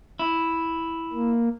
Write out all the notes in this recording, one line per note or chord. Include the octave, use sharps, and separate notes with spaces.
E4
A#3